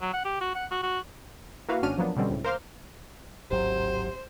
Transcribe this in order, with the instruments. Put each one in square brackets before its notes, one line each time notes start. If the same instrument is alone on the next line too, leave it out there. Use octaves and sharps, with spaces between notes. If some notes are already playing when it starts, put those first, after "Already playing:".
[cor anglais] F#3
F#5
G4
F#4
F#5
F#4
F#4
[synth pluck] A#3 E4 F#4 B4 F5
G#1 C#4 D4 F#4 F6 D#7
F3 F#3 A#3 B3 D4
B2 D3 G3 C4 C#4
C#2 A2
A#4 C5 F5 C6 D6 F6
[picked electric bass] D1 G#1 F#3 [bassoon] C3 [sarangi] C5